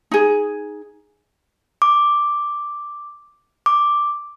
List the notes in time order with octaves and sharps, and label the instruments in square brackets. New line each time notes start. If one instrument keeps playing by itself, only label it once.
[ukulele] D#4 G#4
[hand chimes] D6
D6